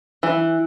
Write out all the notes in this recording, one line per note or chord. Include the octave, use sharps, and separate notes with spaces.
E3